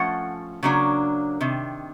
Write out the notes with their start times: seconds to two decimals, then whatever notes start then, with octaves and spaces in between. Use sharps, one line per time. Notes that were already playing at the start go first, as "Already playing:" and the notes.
Already playing: F3 A3 C#4 F#5
0.63 C#3 F#3 A#3 D4
1.41 C3 D#3